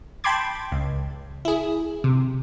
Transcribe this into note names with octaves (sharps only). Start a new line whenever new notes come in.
G5 A5 B5 C6 D6 G#6
C#2
E4 G#4
C3